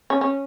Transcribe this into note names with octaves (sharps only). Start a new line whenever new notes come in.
C#4
C#4